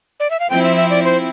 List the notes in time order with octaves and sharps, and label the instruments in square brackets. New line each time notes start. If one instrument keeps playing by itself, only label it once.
[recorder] D5
E5
F5
[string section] F3 C4 E4 [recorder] G5
[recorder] E5
E5
D5
C5